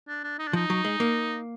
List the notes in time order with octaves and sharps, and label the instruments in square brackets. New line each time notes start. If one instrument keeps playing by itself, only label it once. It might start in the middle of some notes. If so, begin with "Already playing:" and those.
[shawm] D4
D4
D#4
D4
[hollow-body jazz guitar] F3 [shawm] D#4
[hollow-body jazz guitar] F#3
G#3
A#3